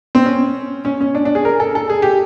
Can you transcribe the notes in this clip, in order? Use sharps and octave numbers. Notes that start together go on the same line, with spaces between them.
C4
C#4
C#4
C#4
D4
D4
G#4
A#4
A4
A4
G#4
G4